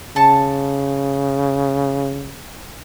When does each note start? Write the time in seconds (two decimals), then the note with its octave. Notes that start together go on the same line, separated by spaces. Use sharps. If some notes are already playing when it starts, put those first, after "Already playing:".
0.16 C#3 A5 C#6